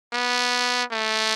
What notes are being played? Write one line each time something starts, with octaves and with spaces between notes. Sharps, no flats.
B3
A3